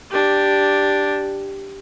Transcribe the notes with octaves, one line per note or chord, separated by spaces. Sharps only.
D4 G4